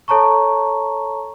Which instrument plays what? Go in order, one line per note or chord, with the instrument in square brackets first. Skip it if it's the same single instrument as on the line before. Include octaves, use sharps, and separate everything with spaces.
[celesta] A4 C#5 A5 A#5 C#6